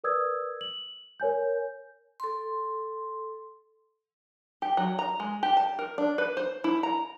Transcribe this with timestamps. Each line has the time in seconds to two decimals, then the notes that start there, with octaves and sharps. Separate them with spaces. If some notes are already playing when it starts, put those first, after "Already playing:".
0.04 A#4 B4 D5 D#6 E6 G#6
0.61 F#7
1.20 A#4 C#5 G#5 G6
2.20 A4 C6
4.62 G4
4.77 F#3
4.99 A#5
5.20 G#3
5.43 G4
5.57 A5
5.79 A#4
5.98 D4
6.18 B4
6.37 C5
6.64 E4
6.83 A#5